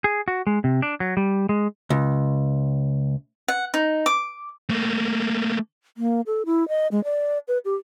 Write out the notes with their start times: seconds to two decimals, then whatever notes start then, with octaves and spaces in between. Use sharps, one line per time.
0.04 G#4
0.28 F#4
0.47 G#3
0.64 C3
0.82 D4
1.00 F#3
1.17 G3
1.49 G#3
1.90 C#2
3.48 F#5
3.74 D#4
4.06 D6
4.69 A3 A#3
5.97 A#3
6.27 A4
6.46 E4
6.69 D#5
6.92 G#3
7.04 D5
7.48 B4
7.65 G4